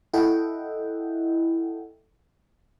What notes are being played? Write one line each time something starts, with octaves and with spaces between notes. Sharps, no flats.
E4 A4 D#5 E5 F#5 G5